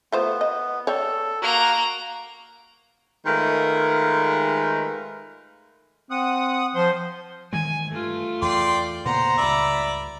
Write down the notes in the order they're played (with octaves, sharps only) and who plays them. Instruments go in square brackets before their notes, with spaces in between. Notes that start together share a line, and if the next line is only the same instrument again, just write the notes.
[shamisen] A3 F4 C5 [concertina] B3
[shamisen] D#5
[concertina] A4 [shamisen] C#5 D5 G5
[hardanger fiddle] A#3 A#5 [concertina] F#4 A#4
[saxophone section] D#3 G#3 A3 F4 A#4 B4
[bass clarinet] C4 [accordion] F#5 D#6
[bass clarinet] F3 [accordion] C5 C6
[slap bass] D#3 E3 G#3 [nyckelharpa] G#5
[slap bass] G2 [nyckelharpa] A3 F4
[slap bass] E2 [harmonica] D5 G5 C6
[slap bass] A#2 C#3 B3 [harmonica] C5 F#5 [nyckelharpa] A#5
[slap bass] C#2 G2 [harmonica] D5 E5 B5